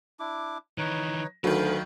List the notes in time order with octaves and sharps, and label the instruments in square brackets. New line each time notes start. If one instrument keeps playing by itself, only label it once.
[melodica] D4 E4 D6
[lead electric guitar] D#3 E3 [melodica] D#4 B4 C#5
[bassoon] D2 [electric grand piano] D#3 F#3 [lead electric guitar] B4 [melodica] F5 B5